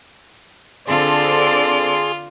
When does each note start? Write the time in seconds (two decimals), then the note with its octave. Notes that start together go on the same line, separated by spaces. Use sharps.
0.88 D3 C4 F4 G#4 A4 D5 C6